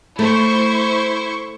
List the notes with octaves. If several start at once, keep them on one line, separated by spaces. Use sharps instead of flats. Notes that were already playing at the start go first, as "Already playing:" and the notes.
A3 E4 C5 C#6